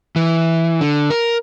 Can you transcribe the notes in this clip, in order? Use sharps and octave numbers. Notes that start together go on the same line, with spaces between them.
E3
D3
A#4